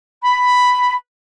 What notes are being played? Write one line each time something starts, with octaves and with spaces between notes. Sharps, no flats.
B5